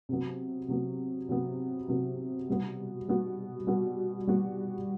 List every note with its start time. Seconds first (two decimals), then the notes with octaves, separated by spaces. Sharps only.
0.09 C3 F#3 B3
0.68 C3 F#3 B3
1.29 C3 F#3 B3
1.88 C3 F#3 B3
2.48 B2 G3 B3 F#4
3.08 B2 G3 B3 F#4
3.67 B2 G3 B3 F#4
4.27 B2 G3 B3 F#4